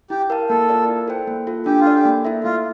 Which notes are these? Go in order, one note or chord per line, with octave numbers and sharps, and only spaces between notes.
E4 G4
A#4 F5 A5
A#3 A4
F4 A#4 D5 F5
E4
A4 C5 G5
A#3
F4 A4
D4 G4
F4
A4 D5
G4
A#3
E4 A4 E5
A3 F4